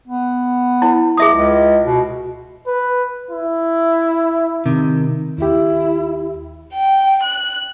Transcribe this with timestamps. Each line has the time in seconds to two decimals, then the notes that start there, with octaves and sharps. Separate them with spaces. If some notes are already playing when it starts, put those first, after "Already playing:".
0.08 B3
0.82 E4
1.17 G#4 E5 D#6
1.33 C#2
1.84 B2
2.67 B4
3.31 E4
4.66 C3 D#3
5.38 D#2 E4 G4
6.73 G5
7.23 F#6